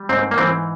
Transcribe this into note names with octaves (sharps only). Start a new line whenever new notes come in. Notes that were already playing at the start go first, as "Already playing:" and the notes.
Already playing: G3
G#2 C4
A#3
E3 C4